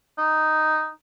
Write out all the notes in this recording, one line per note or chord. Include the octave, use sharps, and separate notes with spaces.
D#4